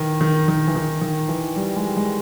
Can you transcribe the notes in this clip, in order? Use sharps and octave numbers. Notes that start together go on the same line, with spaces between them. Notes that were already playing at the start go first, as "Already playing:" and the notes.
Already playing: D#3 E3
D#3
D#3
E3
D#3
D#3
E3
G3
G#3
G#3